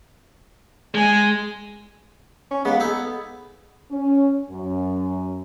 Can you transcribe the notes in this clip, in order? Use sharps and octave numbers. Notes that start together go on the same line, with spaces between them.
G#3 G#5
C#4
G#3 A#3 B3
D#4 G#4 A4
C#4
F#2